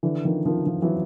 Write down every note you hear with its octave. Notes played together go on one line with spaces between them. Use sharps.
D3 E3
D#3 F3
D#3 F3
D#3 F3
E3 F#3